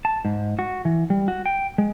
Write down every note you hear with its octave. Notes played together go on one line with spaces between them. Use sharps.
A5
G#2
F#4
E3
G3
F#4
G5
G#3